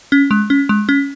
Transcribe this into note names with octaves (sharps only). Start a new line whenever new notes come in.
C#4
G#3
C#4
G#3
C#4